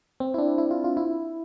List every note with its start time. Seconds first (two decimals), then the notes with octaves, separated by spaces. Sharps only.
0.20 C4
0.34 E4
0.38 D4
0.58 E4
0.71 F4
0.84 F4
0.97 E4